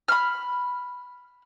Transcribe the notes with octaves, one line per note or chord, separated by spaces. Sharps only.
B5 C6 F6